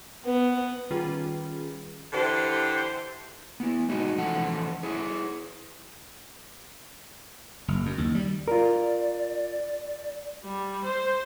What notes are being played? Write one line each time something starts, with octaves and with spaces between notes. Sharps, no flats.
B3
D#3 G3 C#4 F4 G#4 B4
D3 E3 G4 C5
B3 E4
G3 G#3 D#4 F#4
E3 F3 C#4 A4 F#5
E4 G#4 C#5
F#1
F#2
D#2
G3
F4 A#4 D5
G3
C5